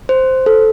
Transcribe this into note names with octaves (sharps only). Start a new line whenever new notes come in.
C5
A4